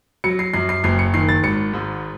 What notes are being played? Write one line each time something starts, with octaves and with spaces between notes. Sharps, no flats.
F#3 C#7
C7
F#2 C7
C7
F#1 C7
C#7
D#3 C7
A6
G#1 C#7
G#2